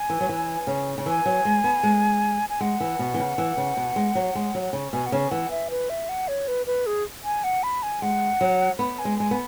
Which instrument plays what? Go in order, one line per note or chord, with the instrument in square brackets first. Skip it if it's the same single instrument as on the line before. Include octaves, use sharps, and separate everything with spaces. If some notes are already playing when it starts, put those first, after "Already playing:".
Already playing: [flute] G#5
[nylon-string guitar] E3
F#3
E3
C#3
C#3
[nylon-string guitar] E3 [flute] G#5
[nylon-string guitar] F#3
G#3
B3
G#3
[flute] G#5
[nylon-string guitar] G#3 [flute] F#5
[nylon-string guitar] E3
B2
E3
C#3
E3
C#3
B2
G#3
F#3
G#3
F#3
C#3
[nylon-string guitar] B2 [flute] G#5
[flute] F#5
[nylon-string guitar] C#3 [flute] G#5
[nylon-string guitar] E3 [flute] F#5
[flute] E5
B4
E5
F#5
C#5
B4
B4
G#4
G#5
F#5
B5
G#5
[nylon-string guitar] G#3 [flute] F#5
[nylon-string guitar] F#3
[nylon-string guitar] B3 [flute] B5
[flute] G#5
[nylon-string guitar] G#3
[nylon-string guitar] G#3 [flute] G#5
[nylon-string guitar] B3